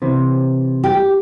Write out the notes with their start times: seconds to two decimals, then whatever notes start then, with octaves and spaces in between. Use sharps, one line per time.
0.02 C3 E3
0.84 G4